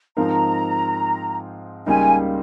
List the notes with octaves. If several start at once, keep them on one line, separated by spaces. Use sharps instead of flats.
G#2 F3 C4 D#4 A#4 A#5
C#2 C#3 G3 A#3 D#4 G#5